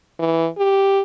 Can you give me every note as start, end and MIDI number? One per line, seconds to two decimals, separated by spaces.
0.19 0.48 52
0.58 1.02 67